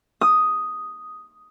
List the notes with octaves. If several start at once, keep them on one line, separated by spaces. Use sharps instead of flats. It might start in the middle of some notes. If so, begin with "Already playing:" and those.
D#6